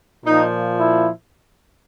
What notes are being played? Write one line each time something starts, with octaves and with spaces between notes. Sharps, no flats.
A#2 F3 D#4
E4